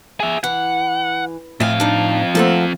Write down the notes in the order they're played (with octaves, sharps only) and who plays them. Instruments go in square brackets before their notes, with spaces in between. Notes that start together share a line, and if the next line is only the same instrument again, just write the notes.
[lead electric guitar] G#4 E5
[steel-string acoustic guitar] E3 [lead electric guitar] F#5
[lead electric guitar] F2 F5 [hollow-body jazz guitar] A2 [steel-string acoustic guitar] E5 G#5
[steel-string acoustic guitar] D4 D#4
[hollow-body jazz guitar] F3 A3 C4 [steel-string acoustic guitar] A#3 A4 F#5